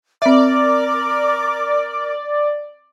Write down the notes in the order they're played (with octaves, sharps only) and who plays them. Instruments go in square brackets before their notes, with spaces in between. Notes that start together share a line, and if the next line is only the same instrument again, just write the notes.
[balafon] C4 E5 [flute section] A#4 D6 [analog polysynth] D5